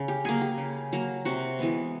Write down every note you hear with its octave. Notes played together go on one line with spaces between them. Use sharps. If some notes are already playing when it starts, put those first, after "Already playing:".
Already playing: C#3
G4
F#3 A#3 G#4
G4
C#3
F#3 A#3
C3 F#4
E3 G#3 B3